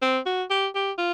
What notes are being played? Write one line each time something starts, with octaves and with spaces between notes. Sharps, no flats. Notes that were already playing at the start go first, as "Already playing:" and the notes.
C4
F#4
G4
G4
F4